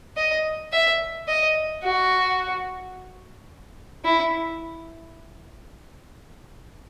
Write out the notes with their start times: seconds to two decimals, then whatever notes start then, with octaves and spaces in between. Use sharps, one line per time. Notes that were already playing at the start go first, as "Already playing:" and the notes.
0.17 D#5
0.72 E5
1.28 D#5
1.83 F#4
4.04 E4